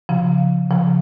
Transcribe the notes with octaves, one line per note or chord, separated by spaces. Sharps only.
C#3 F3
C#3 F3